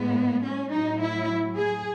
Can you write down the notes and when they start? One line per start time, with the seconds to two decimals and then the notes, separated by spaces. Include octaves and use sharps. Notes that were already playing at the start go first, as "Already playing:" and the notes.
Already playing: A2 G#3 B3
0.43 C#4
0.71 A2 F#3 D#4
0.99 E4
1.56 G#4